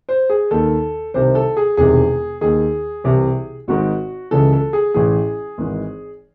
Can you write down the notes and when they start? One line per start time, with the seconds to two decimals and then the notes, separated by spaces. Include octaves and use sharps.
0.09 C5
0.30 G#4
0.51 D#2 D#3 A4
1.14 C2 C3 D#3 C5
1.35 A4
1.57 G#4
1.77 E1 E2 C3 D#3 G#4
2.41 D#2 D#3 G#4
3.04 C2 C3 E3
3.68 G#1 G#2 D#3 F#4
4.31 C#2 C#3 E3 A4
4.52 A4
4.73 G#4
4.94 A1 A2 E3 G#4
5.58 G#1 G#2 E3